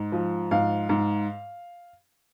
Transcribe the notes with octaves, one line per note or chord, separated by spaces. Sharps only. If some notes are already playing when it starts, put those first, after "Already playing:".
Already playing: G#2
F3
G#2 F5
G#2